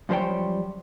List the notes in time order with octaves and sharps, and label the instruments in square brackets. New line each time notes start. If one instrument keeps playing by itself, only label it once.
[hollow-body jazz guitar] F#2 F3 G3 C5 C#5 G5